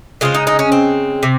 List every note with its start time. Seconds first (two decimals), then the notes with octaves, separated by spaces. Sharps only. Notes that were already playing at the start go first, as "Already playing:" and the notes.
0.21 C#3 G#3 C4 F4
0.35 D#4
0.47 D#4
0.59 C#4
0.72 C4
1.23 C3